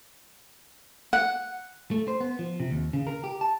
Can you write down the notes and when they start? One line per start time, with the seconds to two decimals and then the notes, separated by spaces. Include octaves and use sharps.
1.13 F#5
1.91 A3
2.08 C5
2.20 B3
2.39 F3
2.60 C3
2.71 D#2
2.93 C#3
3.07 A#4
3.24 G4
3.41 A5